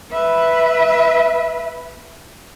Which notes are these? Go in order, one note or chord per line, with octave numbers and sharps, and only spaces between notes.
B4 E5